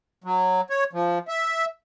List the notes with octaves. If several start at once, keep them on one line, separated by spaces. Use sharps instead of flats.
F#3
C#5
F3
E5